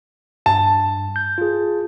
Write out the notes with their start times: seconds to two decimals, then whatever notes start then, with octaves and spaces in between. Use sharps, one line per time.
0.46 G2 A5
1.16 G6
1.38 F4 G#4